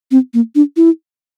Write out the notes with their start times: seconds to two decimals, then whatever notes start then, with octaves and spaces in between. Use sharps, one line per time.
0.11 C4
0.34 A#3
0.55 D4
0.77 E4